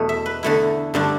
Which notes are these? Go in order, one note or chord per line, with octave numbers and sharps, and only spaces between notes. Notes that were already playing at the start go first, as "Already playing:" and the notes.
Already playing: E2 B2 A3
E5
B4
E2 D3 A3 E4
G2 D3 A3 D4